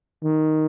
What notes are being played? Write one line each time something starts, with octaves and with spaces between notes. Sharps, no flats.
D#3